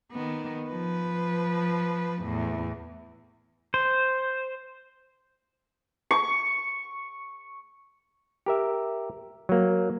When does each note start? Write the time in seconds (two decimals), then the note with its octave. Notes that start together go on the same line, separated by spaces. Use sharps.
0.12 D#3 B3
0.70 F3 B4
2.23 E2 A2
3.74 C5
6.11 C#6
8.46 G4 A#4 E5
9.49 F#3 A#3